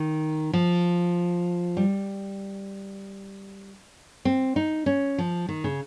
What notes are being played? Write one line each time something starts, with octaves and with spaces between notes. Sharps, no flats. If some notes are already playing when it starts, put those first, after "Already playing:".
Already playing: D#3
F3
G3
C4
D#4
C#4
F3
D#3
C#3